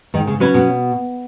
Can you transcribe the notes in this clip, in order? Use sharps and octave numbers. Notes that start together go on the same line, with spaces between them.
G#2 D#3
C#3
C#3 F#3 C#4 F#4 B4
B2